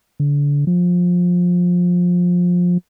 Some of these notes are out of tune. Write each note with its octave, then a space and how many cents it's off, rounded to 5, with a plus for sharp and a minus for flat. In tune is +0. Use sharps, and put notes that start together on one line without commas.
D3 -30
F3 +20